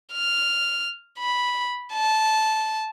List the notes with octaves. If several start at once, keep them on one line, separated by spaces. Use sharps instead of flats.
F6
B5
A5